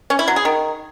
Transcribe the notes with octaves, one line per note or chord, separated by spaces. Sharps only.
C#4
E4
F#3
G#4
D#3